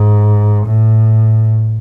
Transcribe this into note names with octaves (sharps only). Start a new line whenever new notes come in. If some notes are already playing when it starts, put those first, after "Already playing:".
Already playing: G#2
A2